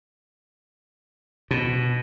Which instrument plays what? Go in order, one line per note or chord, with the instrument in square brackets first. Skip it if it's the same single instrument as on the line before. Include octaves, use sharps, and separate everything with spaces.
[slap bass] B2